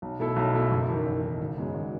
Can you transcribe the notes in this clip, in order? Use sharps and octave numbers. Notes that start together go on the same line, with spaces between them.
B1
B2 A3 E4 A4
B1
B2 A3 E4 A4
F#1
E2 D#3
F#1
E2 D#3
G#1
F#2 C#3 G#3 B3
G#1